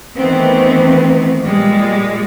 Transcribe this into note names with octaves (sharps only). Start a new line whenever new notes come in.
D#3 E3 A3 B3 C4
A#2 G3 G#3